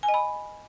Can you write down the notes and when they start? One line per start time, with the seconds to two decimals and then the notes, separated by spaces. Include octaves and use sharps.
0.03 G#5
0.08 D#5
0.14 B5